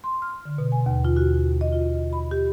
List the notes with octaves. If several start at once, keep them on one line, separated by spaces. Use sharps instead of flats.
C6
F6
D3
B2
G#5
D#2
F4
F#4
D#5
F4
B5
G4